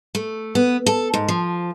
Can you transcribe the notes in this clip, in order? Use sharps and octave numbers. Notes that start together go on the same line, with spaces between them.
A3
B3
A4
G#2
F3